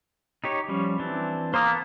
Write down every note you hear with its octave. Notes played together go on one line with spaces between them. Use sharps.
D#4 G4 C#5
F3 G3 C#4
E3 C4 D4
A#3 C5 D#6 F6
B3 A5